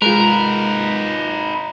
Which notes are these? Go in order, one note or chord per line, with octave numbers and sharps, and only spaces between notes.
G#3 D#4 F4 A#4 B4